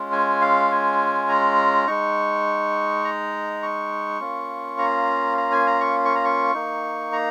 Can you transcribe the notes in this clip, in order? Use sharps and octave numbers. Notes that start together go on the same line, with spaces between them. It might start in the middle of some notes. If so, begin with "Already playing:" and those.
Already playing: G#3 C#4 F4
G#5
F5
G#5
A#5
G#3 D#4 C#6
A#5
C#6
A#3 C#4 F4
A#5
A#5
G#5
A#5
C#6
C#6
A#5
C#6
A#3 D#4
A#5